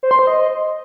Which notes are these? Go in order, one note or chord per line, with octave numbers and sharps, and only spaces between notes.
C5
C6
C5
D#5